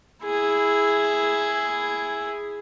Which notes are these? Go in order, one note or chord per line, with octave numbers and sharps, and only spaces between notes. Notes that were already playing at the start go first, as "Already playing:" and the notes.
E4 G#4